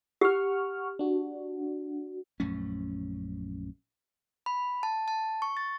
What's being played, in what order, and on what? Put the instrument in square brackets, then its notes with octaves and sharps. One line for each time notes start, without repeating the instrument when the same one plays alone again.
[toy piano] G4 [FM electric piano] F#5 C#6 F6
[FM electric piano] D4 F#4
[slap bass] A#1 F#2 A3 C#4
[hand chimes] B5
A5
A5
C#6
A6